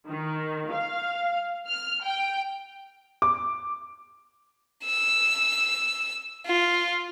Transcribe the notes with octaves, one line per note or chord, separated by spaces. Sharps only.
D#3
F5
F6
G5
D6
E6
F4